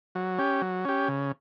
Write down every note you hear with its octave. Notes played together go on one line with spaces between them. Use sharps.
F#3
C#4 G4
F#3
C#4 G4
C#3